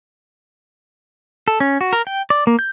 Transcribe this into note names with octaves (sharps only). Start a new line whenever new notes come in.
A4
C#4
F#4
A#4
G5
D5
A#3
G6